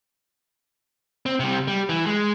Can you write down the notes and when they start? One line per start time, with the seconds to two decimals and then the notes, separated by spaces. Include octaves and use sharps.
1.26 C4
1.40 C3 G3
1.68 G3
1.89 E3
2.06 G#3